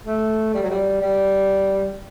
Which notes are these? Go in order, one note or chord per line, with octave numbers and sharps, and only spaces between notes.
A3
G3
F#3
G3
G3